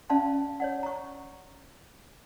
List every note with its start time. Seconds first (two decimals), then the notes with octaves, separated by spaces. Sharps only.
0.10 C#4 D5 F5 A5 C6
0.60 C#5 D5 F#5
0.83 A#5 C#6